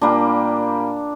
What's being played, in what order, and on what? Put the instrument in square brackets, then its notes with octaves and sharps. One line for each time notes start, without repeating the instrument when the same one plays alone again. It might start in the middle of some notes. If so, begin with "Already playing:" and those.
[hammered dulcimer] A#2 G3 A#3 D4